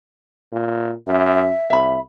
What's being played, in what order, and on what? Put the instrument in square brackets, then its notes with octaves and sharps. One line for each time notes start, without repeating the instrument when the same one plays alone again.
[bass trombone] A#2
[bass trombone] F#2 [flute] E5
[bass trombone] C2 [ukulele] E5 B5